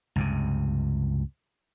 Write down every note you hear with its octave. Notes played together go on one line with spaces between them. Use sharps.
C#2 G2 C3